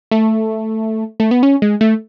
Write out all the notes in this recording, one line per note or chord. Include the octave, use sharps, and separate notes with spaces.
A3
A3
B3
C#4
G#3
A3